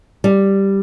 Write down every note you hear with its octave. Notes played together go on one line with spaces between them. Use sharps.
G3